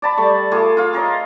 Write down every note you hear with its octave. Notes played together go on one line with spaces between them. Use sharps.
D5 A5 B5
G3 A3 C#6
A3 F4 G#4 D6
F4 F5
G#4 A#4 C#5 D#5